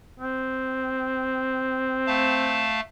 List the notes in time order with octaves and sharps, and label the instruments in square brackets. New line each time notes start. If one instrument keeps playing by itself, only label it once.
[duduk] C4
[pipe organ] A3 F5 A5